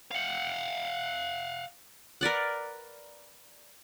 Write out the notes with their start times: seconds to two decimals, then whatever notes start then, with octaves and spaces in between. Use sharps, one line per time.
0.11 F5 F#5
2.21 A#4 B4 D5 F#5